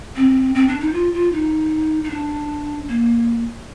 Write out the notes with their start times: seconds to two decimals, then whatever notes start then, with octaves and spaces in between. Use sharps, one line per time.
0.16 C4
0.55 C4
0.68 D4
0.80 D#4
0.93 F4
1.14 F4
1.33 D#4
2.04 D#4
2.10 D4
2.88 A#3